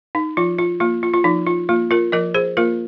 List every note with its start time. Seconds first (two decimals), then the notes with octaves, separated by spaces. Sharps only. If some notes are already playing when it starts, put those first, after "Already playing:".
0.15 D#4
0.37 F3 F4
0.59 F4
0.80 A#3 F4
1.03 F4
1.14 F4
1.24 F3 D#4
1.47 F4
1.69 A#3 F4
1.91 F4 A#4
2.12 F3 A#4 D#5
2.34 G#4 C5
2.57 A#3 F4 A#4